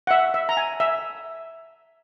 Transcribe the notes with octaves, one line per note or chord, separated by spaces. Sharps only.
F#5
E5
E5
A#5
G#5
E5